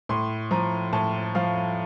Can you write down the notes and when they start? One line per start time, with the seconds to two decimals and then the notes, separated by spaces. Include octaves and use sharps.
0.09 A2 C6
0.51 F3 A#5
0.93 A2 A5
1.35 F3 F5